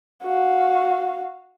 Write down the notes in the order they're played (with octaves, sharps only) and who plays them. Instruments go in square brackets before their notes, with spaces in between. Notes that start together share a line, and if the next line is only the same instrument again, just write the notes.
[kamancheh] F#4 F5